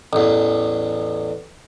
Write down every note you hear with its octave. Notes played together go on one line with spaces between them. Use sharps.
A1 E2